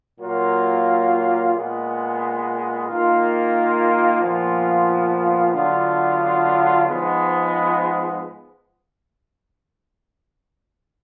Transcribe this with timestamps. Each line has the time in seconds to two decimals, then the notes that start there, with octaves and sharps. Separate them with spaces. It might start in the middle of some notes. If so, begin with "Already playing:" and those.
0.19 A#2 F#3 A#3 F4
1.52 A#2 G#3 B3
2.86 D#3 A#3 F4
4.20 A#2 F3 B3 F4
5.54 D3 F#3 B3 D4 F4
6.87 G#2 F3 G#3 B3